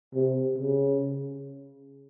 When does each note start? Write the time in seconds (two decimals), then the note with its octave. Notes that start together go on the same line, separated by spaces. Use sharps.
0.15 C3
0.58 C#3